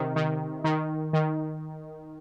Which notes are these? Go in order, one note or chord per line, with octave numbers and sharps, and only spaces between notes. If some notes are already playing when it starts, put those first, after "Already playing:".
Already playing: C3 D#3
D#3
D#3
D#3